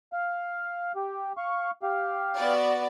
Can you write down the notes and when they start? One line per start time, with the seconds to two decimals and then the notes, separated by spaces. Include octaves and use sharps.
0.13 F5
0.96 G4
1.37 F5 C#6
1.83 G4 F5
2.36 B3 F#4 D5